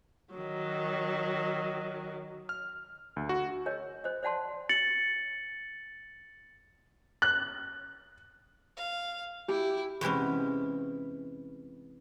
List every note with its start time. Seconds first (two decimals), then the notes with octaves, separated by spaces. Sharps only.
0.35 D#3 F#3
2.49 F6
3.16 D2
3.29 F#4
3.66 A#4 C#5 D#5
4.04 C5 D#5
4.23 C5 D5 F#5 A5 C6
4.69 A6 C#7 F#7
7.22 F#6
8.77 F5
9.48 E4 G4
10.01 E2 C3 E3 G#3 C#4